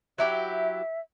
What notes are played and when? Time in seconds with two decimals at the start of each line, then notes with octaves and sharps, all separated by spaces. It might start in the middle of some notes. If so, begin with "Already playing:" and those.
0.18 F#3 E4 G4 E5